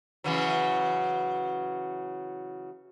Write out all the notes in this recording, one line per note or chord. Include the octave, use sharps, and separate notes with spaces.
C#3 E3 F#3